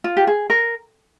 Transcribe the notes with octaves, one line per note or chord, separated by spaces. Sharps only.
F4
G4
G#4
A#4